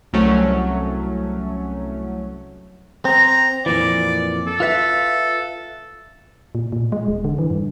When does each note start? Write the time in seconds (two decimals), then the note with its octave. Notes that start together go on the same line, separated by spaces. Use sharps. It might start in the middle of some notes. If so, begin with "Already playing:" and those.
0.13 C2 F#3 A3 C#4
3.05 C4 A#5
3.66 F2 A#2 E3 D5
4.47 A4
4.60 F4 B4 E5
6.55 A#2
6.72 A#2
6.92 G#3
7.08 D#1
7.24 D3
7.39 E3
7.50 G2